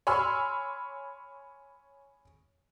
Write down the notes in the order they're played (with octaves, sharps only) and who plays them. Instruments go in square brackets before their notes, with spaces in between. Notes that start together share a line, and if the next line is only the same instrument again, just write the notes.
[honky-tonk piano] C#5 G#5 B5 C6 E6 F6